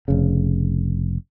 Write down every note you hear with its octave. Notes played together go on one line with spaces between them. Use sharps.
F1 C#3